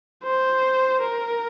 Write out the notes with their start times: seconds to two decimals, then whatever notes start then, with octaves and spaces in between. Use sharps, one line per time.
0.24 C5
1.02 A#4